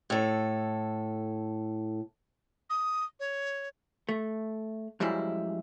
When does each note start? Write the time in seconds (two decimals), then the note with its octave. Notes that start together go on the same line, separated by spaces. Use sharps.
0.10 A2 A4
2.70 D#6
3.20 C#5
4.09 A3
5.00 F#2 F3 G3 G#3 E4